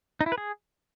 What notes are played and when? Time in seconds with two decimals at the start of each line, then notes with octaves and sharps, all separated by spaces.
0.21 D#4
0.26 E4
0.32 B4
0.38 G#4